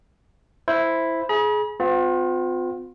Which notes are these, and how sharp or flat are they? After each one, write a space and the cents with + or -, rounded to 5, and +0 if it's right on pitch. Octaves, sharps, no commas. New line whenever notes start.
E4 +0 C5 +0
G#4 +20 B5 -45
C4 -40 F4 +35